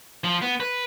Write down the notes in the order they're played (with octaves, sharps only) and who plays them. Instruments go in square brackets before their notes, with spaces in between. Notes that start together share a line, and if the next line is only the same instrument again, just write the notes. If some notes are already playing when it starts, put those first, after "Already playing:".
[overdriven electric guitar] F3
B3
B4